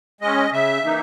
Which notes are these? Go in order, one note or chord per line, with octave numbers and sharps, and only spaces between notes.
G#3 C#4 D#5
C#3 E5
E3 A#3 D#4